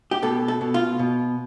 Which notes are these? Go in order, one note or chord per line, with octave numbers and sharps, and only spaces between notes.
G4
B2 A4
A4
B2
F4
B2